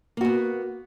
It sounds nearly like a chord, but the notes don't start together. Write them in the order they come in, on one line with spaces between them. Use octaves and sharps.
A#3 F#4 B3